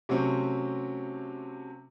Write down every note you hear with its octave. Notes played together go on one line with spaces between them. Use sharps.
C3 F#3 A3 C4 C#4